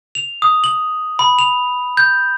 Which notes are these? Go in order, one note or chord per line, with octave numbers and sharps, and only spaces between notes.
F7
D#6
F#7
B5
F7
G6